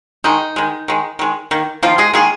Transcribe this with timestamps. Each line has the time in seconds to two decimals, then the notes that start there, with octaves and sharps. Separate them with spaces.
0.24 D#3 G#3 D#4
0.56 D#3 G#3
0.88 D#3 G#3
1.19 D#3 G#3
1.51 D#3 A#3
1.83 D#3 F3 A#3 F4
1.98 G#3 G#4
2.14 D#3 G#3 A#3 G#4